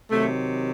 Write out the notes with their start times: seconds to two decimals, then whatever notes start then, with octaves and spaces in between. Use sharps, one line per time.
0.11 C3 D#3 F#3 A3